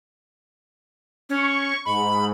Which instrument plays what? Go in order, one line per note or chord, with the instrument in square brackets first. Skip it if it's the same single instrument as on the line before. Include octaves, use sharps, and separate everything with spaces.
[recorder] C#4 [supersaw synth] C#6
[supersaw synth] G#2 [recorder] B5